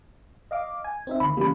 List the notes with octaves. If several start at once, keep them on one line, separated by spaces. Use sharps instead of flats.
D#5 F5 D6
G#5
C4 D#4 E5
D2 D#3 B5
C#3 E3 G3 A#3 B5